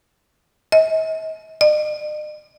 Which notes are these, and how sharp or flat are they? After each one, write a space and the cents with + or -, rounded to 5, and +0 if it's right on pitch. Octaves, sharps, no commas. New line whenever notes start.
D#5 +45
D#5 -45